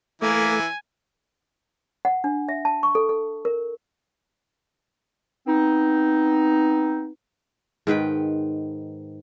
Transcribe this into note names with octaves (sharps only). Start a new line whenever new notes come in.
E3 A3 A#3 E4 G#5
F#5
D4
E5
A5
C#6
A4
A4
A#4
B3 C4 D#4
G#2 D#3 B4 G5